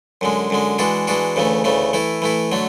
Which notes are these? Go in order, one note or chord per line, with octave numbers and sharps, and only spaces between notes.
F#2 D3 G#3
F#2 D3 G#3
E3 G#3 D4 F#4
E3 G#3 D4 F#4
D2 C#3 E3 A3
D2 C#3 E3 A3
E3 A3 E4
E3 A3 E4
D3 F#3 A3